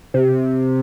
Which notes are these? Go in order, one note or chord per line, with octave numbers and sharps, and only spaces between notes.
C3